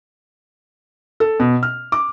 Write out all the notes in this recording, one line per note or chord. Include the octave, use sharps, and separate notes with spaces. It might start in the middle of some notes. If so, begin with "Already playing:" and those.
A4
B2
F6
D6